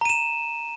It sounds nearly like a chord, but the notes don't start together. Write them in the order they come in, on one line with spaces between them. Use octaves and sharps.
A#5 D#7 E7